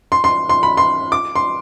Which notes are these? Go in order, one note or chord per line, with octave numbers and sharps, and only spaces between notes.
C6
C6
C6
B5
C6
D6
C6